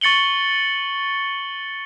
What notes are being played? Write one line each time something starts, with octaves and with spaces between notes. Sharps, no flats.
C#6 A6 C#7 F#7 G7